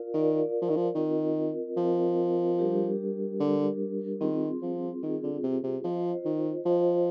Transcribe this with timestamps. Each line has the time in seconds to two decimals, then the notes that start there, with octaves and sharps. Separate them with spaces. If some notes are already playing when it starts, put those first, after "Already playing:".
Already playing: F4 A#4 D5 F5
0.14 D#3 F4 A#4 D5 F5
0.62 F3
0.69 D#3
0.76 F3
0.95 D#3 C4 F4 A#4 D#5
1.77 F3 C4 F4 A#4 D#5
2.58 G3 D4 G4 A#4
3.40 D3 G3 D4 G4 A#4
4.21 D#3 C4 F4 G#4
4.62 F3
5.03 D#3 C4 F4 G#4
5.23 D3
5.43 C3
5.64 C3
5.84 F3 F4 C5 D#5
6.25 D#3
6.66 F3 F4 C5 D#5